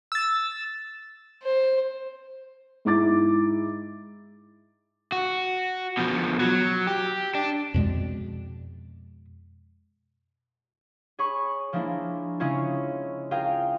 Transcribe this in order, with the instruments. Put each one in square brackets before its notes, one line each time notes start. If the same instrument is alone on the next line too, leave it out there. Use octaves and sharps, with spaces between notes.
[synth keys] E6 A6
[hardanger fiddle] C5
[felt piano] G#2 E4 D6 A6
[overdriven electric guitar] F#4
B2 F3
F#3
G4
D4
[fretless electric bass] F2 B2 G#3
[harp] G#4 C#5 B5 C#6
F3 G#3 A#3 D4 E4
C#3 G#3 C#4 E4 F4 C#5
F4 G#4 A#4 F5 G5